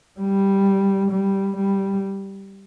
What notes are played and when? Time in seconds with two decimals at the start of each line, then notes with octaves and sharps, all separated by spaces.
0.20 G3
1.11 G3
1.57 G3